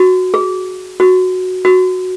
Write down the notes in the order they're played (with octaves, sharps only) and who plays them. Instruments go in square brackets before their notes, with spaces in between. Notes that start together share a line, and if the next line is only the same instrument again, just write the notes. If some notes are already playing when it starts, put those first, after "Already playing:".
Already playing: [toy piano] F#4
G#4
F#4
F#4